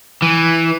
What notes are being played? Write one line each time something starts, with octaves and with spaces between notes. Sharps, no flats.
E3